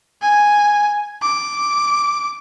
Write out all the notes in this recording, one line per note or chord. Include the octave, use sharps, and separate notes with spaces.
G#5
D6